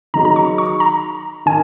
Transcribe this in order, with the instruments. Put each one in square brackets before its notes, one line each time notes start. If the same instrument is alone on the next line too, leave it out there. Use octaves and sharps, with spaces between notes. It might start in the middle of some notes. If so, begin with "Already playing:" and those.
[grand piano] D#3 F#3 D#4 G#4 [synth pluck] A#5
[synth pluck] A#5
C#6
C#6
A#5
[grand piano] D#3 [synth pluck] G#5